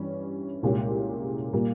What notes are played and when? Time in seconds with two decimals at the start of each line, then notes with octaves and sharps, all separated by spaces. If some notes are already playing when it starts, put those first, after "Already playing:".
Already playing: G2 E3 G3 C#4
0.63 C2 A#2 G#3 C#4 G4
1.53 A#2 G3 A#3